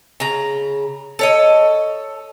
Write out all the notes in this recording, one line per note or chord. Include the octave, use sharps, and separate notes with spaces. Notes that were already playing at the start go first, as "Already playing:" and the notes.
C#3 A#5
A4 C#5 D#5